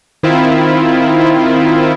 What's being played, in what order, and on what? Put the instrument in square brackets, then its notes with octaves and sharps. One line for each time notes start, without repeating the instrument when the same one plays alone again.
[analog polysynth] D#3 C4 E4 F4